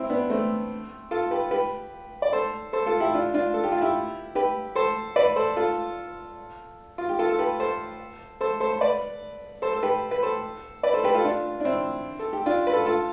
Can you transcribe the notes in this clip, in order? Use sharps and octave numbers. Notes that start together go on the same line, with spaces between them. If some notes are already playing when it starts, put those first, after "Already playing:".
Already playing: C4 E4
B3 D4
A3 C4
F4 A4
G4 B4
G4 B4
D5
A4 C5
A4 C5
F4 A4
E4 G4
D4 F4
D4 F4
A4
G4
F4
E4 G4
G4 B4
A4 C5
B4 D5
A4 C5
F4 A4
F4
G4
F4 A4
A4
G4 B4
A4 C5
A4 C5
A4 C5
C5
B4 D5
A4 C5
A4
G4 B4
B4
A4 C5
B4 D5
A4 C5
G4 B4
F4 A4
D4 F4
D4
C4 E4
A4
G4
D4 F4
B4
F4 A4
F4 A4